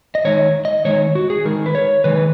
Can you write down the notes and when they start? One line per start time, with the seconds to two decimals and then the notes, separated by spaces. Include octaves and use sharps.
0.15 D#5
0.25 D#3 G#3 D#4 C#5
0.65 D#5
0.85 D#3 G#3 D#4 C#5
1.15 F#4
1.30 G#4
1.45 D#3 G#3 D#4 A#4
1.66 B4
1.75 C#5
2.04 D#3 G#3 D#4 B4